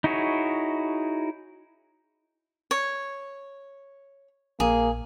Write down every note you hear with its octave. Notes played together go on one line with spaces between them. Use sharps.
D#4 E4 F#4 G#4 C#5
C#5
A#1 A#3 G#4